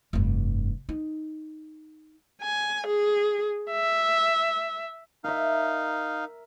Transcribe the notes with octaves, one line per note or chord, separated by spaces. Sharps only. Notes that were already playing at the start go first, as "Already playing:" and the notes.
F1 G2
D#4
G#5
G#4
E5
D#4 A#4 E5 F5